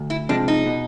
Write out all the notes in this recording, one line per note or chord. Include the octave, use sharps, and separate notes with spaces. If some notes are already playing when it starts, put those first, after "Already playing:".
Already playing: D2
E4
C3 F3 G#3 D4
D#4
B2